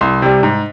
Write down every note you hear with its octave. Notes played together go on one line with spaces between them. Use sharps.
C2 C6
C3 G3
G#2